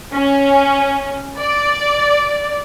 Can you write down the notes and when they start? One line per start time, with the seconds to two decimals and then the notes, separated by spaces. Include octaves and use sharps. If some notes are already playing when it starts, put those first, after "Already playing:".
0.14 C#4
1.38 D5